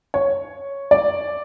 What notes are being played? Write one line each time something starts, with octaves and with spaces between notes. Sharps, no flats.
C#5
D5